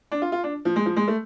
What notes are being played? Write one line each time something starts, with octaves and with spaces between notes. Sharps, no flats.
D4
F4
F4
D4
F3
G#3
F3
G#3
A3